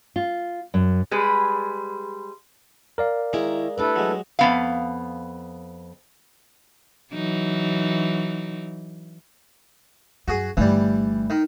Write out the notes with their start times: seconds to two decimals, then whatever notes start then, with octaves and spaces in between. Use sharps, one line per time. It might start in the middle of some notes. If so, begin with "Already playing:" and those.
0.16 F4
0.74 F#2
1.11 G3 G#3 G#4 B4
2.98 A#4 D5 F5
3.33 D#3 G#3 E4 A#5
3.78 G3 A3 D4 E4 A4 B4
3.96 F#3 G#3
4.39 F2 B3 F5
7.13 E3 F#3 D#4
10.28 F#2 F#4 G#4
10.57 G1 E3 G3 A3
11.30 D#3